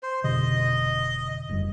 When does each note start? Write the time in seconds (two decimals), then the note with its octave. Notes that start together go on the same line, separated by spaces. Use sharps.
0.03 C5
0.24 F1 B2 D3 D#5
1.49 F1 G2